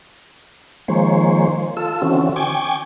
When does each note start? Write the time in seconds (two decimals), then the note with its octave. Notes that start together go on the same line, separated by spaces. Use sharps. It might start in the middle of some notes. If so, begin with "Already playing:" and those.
0.88 D#3 F3 G#3 A#3 C5 C#5
1.77 F4 A4 E6
2.02 D3 E3 C4 C#4 F#4
2.36 G5 G#5 C#6 D6